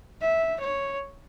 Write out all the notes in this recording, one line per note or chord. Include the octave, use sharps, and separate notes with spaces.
E5
C#5